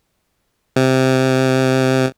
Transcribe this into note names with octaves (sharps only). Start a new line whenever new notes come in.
C3